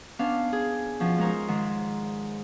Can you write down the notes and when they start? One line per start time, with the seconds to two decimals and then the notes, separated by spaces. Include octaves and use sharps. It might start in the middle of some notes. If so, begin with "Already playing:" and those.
0.19 B3 C#4 D4 F5
0.52 G#4
1.00 B2 F3 C#4
1.18 G#3 C#4 D#4 A#4 C5
1.48 G#2 D#3